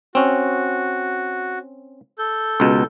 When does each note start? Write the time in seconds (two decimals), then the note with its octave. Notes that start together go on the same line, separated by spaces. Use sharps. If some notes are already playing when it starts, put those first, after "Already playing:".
0.15 C4 C#4 F#4
2.18 A4 G6
2.60 C#2 B2